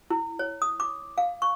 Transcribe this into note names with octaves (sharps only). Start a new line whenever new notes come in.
E4
C#5
D#6
D6
F5
C#6